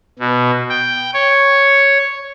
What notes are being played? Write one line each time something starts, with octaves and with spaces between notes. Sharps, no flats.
B2
G5
C#5